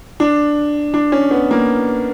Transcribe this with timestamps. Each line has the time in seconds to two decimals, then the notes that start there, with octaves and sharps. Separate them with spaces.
0.20 D4
0.94 D4
1.12 C#4
1.31 B3
1.51 A#3